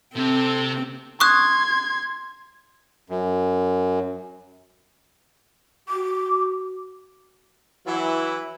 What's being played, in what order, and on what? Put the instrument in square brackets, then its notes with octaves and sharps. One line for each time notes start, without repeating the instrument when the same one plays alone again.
[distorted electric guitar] C3 [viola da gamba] C4 [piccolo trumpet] A4
[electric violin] C6 G#6 [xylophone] C#6 D#6 F#6
[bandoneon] F#2
[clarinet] F#4 [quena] D6
[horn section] E3 F#3 E4